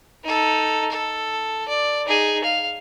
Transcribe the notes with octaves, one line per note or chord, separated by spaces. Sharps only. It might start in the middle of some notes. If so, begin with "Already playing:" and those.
D#4 A4
A4
D5
D#4 G#4
F5